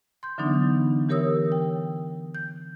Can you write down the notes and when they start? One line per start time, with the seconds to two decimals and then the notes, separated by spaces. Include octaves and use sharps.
0.23 C6 G6
0.38 D3 E3 F#3 B3 D4 D#4
1.09 E3 G4 A#4 C#5 D#6 E6
1.52 G5
2.35 G6